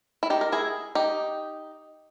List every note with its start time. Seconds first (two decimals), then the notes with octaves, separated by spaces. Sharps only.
0.23 E4
0.30 D#4 G4
0.41 A#4
0.52 E4 G#4
0.95 D#4 G4